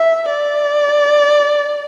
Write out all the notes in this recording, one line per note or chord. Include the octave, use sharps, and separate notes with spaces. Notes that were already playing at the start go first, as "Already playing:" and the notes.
Already playing: E5
D5